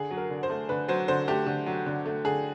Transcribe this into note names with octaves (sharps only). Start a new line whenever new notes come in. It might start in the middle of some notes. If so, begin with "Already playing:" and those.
Already playing: D3 G#4
F#3
A#4
D3
C5
A3
D3 B4
F#3 C5
D3 C5
A3 G4
D3
F#3
D3
A3
D3 G#4